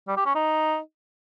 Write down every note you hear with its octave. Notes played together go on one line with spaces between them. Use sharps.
G3
G4
C#4
D#4